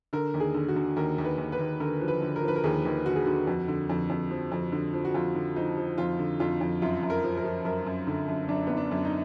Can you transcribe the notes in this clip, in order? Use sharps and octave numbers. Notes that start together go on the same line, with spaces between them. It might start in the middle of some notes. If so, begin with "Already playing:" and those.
D3 A#4
D#2
G#4
D3
F#4
D3
D#2 A#4
D#2
B4
D#2
B4
D#2
D3 A#4
F3
B4
D3
A#4
F3 B4
A#4
D#2 G#4
D#2
D3 F#4
G#4
D3 F#4
F2
D3
F2
F2
F3
F2
D3
F3
F#4
F2 F4
D3
F3 D#4
F3
F2 F4
D3
F2 F4
F2
F#2 F4
F#2
A#4
F3
A#4
F3
F#2 A#4
F#2
D3
F#2
F#2 D4
F#2 B3
D4
F#2
D#4